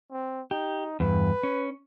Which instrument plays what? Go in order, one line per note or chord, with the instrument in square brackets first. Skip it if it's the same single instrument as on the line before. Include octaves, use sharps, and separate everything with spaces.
[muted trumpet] C4
[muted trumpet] D#4 [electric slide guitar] G4
[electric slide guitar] E2 G2 [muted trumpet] B4
[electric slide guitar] C#4